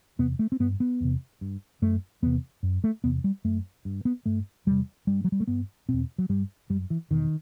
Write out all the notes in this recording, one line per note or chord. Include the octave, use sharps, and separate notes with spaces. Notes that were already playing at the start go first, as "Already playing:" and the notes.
E2 C3 B3
A3
C4
G2 B3
B3
E2 C3
G2
F#2 A3
E2 C3 B3
F#2
A3
E2 C3 B3
G3
F#2 A3
G2
B3
G2 A3
E2 C3 G3
G2 G3
F#3
G3
A3
G2 B3
E2 B2 C4
F#3
G2 G3
F#2 G3
E3
E2 B2 D#3